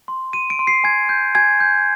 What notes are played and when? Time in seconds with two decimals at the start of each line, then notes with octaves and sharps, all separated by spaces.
0.08 C6
0.33 C6 D#7
0.50 D7
0.59 C6
0.67 C7
0.84 G#5 G#6
1.09 G6
1.35 G#5 G#6
1.60 G6